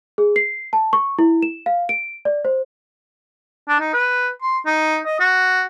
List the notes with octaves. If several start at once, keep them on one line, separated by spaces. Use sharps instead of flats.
G#4
C7
A5
C#6
E4
E7
F5
D7
D5
C5
D4
D#4
B4
C6
D#4
D#5
F#4